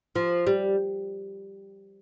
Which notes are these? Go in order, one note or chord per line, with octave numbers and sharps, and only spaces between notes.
F3
G3